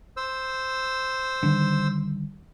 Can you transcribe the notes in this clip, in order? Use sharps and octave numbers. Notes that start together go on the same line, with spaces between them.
C5 E6
D3 D#3 G3